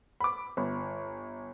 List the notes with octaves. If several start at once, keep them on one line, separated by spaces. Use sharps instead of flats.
B5 D6
G1